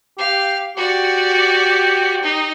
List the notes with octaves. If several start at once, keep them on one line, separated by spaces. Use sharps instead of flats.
G4 F5
F#4 G4 D5
D#4